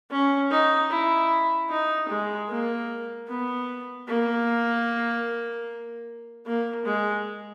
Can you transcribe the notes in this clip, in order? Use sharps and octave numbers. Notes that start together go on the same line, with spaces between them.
C#4
D#4
E4
D#4
G#3
A#3
B3
A#3
A#3
G#3